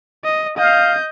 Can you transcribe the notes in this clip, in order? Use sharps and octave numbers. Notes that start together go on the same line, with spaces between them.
D#5
D#5 F5 G6